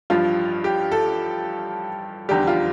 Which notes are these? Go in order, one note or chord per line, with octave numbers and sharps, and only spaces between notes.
A1 G2 F3 F4
G4
A4
F1 E2 D3 G3 G4
F4